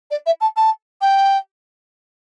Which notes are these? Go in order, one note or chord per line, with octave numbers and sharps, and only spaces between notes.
D5
E5
A5
A5
G5